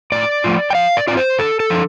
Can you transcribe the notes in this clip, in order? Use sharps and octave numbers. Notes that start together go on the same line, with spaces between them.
A2 D5
F3 A3 F4
G5
F3 F5
D5
C4 F4 D5
C5
D3 A4
A4
F3 D4